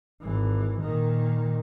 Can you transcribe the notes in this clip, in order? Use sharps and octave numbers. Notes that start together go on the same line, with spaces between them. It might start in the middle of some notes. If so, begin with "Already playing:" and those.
G#1 E3
A#2 D#3